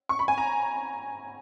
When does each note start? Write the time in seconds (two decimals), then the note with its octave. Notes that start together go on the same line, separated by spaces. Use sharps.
0.09 C#6
0.19 B5
0.28 G#5
0.38 A#5